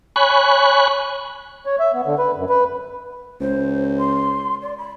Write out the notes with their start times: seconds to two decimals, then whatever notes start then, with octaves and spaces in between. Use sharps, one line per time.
0.16 C#5 G#5 B5 C#6 F#6
1.66 C#5
1.79 E5
1.94 B3
2.06 D3
2.18 B4
2.35 F#2
2.49 B4
3.40 C#2 C5
3.98 C6
4.61 D5
4.78 B5